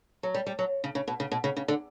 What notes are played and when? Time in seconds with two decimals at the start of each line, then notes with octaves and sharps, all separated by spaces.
0.23 F#3
0.34 G3
0.46 G3
0.59 F#3
0.84 C#3
0.95 C#3
1.08 B2
1.20 C#3
1.31 B2
1.44 C#3
1.56 C#3
1.68 D3